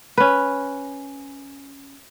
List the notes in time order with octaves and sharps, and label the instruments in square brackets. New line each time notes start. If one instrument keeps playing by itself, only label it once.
[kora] C#4 B4